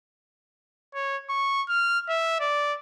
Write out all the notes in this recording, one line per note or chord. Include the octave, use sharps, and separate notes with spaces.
C#5
C#6
F6
E5
D5